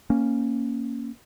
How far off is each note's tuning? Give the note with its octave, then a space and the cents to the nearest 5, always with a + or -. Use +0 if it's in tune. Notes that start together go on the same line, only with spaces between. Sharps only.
A#3 +0 C#4 -5